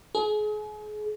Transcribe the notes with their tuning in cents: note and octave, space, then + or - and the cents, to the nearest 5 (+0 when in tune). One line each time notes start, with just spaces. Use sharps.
G#4 +35